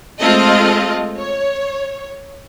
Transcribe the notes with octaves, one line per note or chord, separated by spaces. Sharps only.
G#3 A3 C4 F4 A4 D#5
C#5